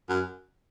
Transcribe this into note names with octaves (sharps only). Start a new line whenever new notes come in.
F#2